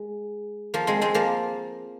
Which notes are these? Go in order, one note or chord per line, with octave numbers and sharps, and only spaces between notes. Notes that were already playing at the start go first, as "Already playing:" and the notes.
Already playing: G#3
F3 A#3
G#3 C4
G#3 C4
F3 A#3